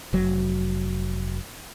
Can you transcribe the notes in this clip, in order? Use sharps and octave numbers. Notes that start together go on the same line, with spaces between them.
F1 F#3